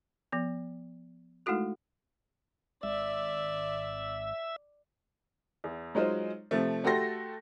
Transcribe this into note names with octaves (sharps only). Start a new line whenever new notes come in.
F3 B3
G#3 A3 D#4 E4 F#4 A4
G#1 D5 E5
E2
F#3 G#3 D#4 F4 C5
C3 F3 A3
A3 F#4 G4 A4 C6 A#6